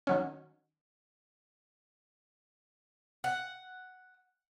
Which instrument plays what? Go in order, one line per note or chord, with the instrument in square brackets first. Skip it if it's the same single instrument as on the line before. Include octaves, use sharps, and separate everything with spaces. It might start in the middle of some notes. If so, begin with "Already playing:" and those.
[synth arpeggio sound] D#3 F#3 C#4
[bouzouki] F#5